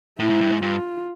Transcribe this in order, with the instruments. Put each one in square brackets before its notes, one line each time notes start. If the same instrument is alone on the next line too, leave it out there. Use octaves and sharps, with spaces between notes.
[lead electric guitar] A2 [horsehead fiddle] E4
[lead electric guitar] G#2
G2
G#2
[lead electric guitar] G2 [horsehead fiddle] F4